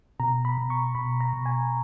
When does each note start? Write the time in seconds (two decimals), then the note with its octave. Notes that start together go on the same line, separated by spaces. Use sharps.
0.20 B2 A#5
0.45 B5
0.58 B2
0.70 C#6
0.95 B2 B5
1.20 A#5
1.33 B2
1.46 G#5